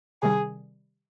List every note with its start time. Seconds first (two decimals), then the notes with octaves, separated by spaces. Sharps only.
0.22 C3 D#3 G3 G#4